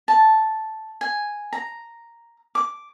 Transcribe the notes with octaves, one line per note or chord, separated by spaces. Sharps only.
A5
G#5
A#5
D6